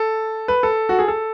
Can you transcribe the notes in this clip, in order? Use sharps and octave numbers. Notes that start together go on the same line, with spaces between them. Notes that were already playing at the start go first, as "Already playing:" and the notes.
Already playing: A4
B4
A4
F#4
G#4
A4